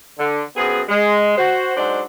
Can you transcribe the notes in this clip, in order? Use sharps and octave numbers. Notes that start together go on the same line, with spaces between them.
D3
F#2 B3 C4 G#4
G#3
F#4 C5
F#3 G#3 D4 D#4 C5 D5